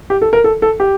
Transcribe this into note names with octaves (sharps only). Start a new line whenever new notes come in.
G4
A4
A#4
A4
A4
G4